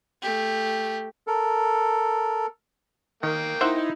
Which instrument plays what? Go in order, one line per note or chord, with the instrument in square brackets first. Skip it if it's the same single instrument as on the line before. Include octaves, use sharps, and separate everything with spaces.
[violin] A3 G4
[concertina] A4 A#4
[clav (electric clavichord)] D#3 [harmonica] A#3 G5
[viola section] D#4 E4 [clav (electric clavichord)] C5 E5 F#5